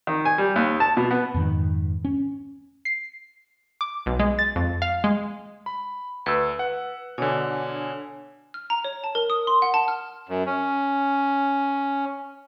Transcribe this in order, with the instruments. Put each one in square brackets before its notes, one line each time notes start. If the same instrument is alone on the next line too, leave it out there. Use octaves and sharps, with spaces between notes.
[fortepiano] D#3
G#5
G3
D#2
A5
B2
B3
[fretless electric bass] F2 G#2 D#3
C#4
[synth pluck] C7
D6
B1
G#3
A6
F2
F5
G#3
[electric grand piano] B5
[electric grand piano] D2 E6 [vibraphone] B4
[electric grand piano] F#5
[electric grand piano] B2 D3 [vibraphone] D4 C#5 G#5
[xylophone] F6
A#5
C#5
A5
A#4
D#6
C6
F#5
A5
F6
[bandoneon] F#2
C#4